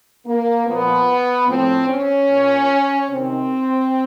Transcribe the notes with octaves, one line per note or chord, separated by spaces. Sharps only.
A#3
A#2 F3 B3
A2 F3 C4
C#4
A#2 F3
C3 D#3 C4